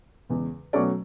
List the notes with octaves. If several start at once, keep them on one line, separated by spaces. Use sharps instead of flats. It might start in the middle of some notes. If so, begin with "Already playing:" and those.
E2 C#3 G#3
B2 F#3 A3 C#4 D5